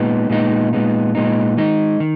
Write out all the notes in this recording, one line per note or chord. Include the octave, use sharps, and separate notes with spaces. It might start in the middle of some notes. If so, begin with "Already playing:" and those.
Already playing: A#2 G#3 B3 D#4
A#2 G#3 B3 D#4
A#2 G#3 B3 D#4
A#2 G#3 B3 D#4
D#3 G#3 D#4
D#3